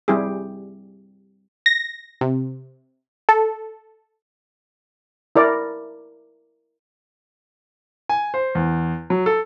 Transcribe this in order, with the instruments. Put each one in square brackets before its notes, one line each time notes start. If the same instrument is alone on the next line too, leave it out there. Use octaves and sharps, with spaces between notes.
[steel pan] G3 C4 E4 G4 G#4
[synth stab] A#6
C3
A4
[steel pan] E4 A#4 D5
[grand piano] G#5
C5
E2
F#3
A4